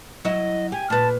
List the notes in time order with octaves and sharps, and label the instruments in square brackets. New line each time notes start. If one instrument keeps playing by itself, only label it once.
[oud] F#3 E4 E5 [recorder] D#5
[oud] G4 [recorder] G#5
[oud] A#2 B4 [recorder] A5